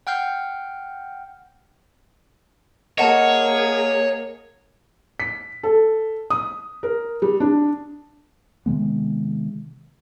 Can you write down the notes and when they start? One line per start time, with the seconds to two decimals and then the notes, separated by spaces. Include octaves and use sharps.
0.07 F#5 G5 F6 G6 C7
2.98 A#3 G#4 C#5 D#5 F#5 A5
5.20 B6
5.63 A4
6.30 D#6
6.83 A#4
7.22 G3
7.40 D4
8.66 C3 D#3 G#3 B3